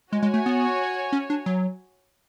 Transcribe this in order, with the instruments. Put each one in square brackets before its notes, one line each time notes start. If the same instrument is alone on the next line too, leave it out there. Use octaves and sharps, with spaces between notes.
[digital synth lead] G#3 [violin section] F#4 C#5 G#5
[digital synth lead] G#3
A3
B3
C#4
D4
F#3